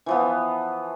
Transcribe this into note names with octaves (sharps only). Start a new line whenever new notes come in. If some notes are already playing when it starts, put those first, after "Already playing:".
E3 F3 B3